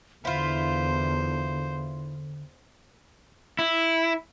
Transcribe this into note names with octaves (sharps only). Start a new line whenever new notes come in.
E2 D3 E4 F4 C5
E4